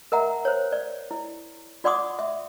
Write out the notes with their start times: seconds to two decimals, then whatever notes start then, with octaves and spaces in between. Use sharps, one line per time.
0.12 A#4 E5 F#5 A#5
0.45 C5 C#5
0.72 D5
1.11 E4
1.84 F4 D5 F#5 C6 D6 D#6
2.19 E5